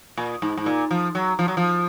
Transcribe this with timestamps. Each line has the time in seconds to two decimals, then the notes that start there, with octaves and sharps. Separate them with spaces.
0.17 A#2
0.42 G#2
0.58 G#2
0.66 A#2
0.91 F3
1.15 F#3
1.39 F3
1.48 F#3
1.57 F3